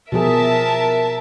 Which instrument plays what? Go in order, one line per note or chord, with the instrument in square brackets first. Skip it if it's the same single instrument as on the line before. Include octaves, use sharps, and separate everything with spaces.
[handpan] B2 F3 G#4 [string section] A#4 E5 A5